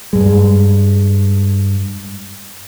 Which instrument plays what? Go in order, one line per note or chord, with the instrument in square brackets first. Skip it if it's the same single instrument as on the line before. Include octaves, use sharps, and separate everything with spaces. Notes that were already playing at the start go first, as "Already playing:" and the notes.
[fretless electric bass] G2 G#3